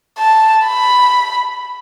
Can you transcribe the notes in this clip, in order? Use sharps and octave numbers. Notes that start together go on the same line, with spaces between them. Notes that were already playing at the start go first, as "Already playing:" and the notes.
A5
B5